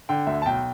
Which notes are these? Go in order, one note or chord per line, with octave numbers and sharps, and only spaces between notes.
D3 G5
D2 E5
A5
B1 G5